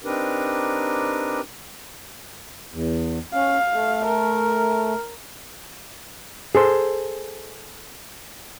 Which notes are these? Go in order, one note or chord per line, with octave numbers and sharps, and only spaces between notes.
C4 D4 D#4 G4 A#4 B4
E2
C#4 F5
A3
A#4
G#4 A4 C5